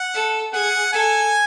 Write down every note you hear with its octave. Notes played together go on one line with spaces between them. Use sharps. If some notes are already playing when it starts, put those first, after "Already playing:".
Already playing: F#5
A4
G#4 F#5
A4 G#5